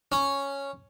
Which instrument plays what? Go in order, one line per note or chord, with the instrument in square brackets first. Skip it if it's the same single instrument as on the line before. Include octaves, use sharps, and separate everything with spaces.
[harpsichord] C#4